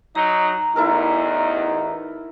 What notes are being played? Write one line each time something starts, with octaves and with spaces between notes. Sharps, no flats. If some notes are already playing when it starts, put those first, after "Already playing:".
F#3 D#4 A#5
A1 E2 D#4 E4 A4 A#4